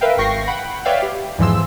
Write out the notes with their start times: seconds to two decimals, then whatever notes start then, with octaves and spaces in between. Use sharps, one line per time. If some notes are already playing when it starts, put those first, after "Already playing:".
0.01 A#4 B4 E5 F5 G5
0.17 G#1 G5 C#6 A#6 C7
0.47 F#5 G5 B5
0.85 B4 C#5 D5 E5 F5 G5
1.02 G4
1.38 E2 G#2 E3 F3 C6 E6